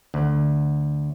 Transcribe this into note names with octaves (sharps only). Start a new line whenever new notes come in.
D2